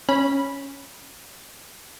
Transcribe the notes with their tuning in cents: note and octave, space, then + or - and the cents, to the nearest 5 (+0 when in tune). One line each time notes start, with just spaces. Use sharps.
C#4 +0 B5 -10